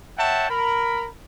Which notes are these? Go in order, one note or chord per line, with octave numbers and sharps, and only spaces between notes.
C#5 E5 F#5 G5 A5
A#4 B5